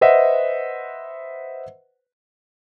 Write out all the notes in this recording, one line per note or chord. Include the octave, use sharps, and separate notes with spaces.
B4 C5 D#5 E5 F#5